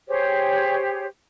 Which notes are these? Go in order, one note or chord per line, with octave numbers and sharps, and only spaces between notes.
G4 G#4 C5 C#5